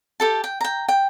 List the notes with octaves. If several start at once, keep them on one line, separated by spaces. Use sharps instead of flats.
G4 A4 A5
G5
G5 A#5
G5